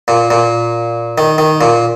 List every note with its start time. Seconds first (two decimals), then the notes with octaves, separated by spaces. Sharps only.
0.08 A#2
0.30 A#2
1.18 D#3
1.38 D#3
1.61 A#2